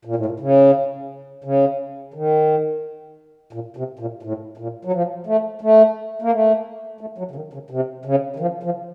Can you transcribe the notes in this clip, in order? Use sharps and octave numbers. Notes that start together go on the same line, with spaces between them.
A#2
A2
A#2
C#3
C#3
D#3
A#2
C3
A#2
A2
A#2
F#3
F3
A3
A3
A#3
A3
A3
F#3
C#3
D#3
C#3
C3
C#3
D#3
F3
F3